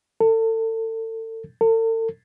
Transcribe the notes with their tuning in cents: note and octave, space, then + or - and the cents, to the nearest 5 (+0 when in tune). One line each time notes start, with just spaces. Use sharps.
A4 +30
A4 +40